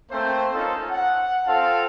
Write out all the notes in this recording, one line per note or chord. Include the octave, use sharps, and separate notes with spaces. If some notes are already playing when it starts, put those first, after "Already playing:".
A3 A#3 C4 C5
C#4 D#4 F4 A4
F#5
C4 F4 A4 F5 A5